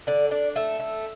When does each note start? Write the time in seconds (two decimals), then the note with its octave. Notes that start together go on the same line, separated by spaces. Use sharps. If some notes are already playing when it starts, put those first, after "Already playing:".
0.07 D3 D5
0.31 D4 D5
0.56 A3 E5
0.80 A3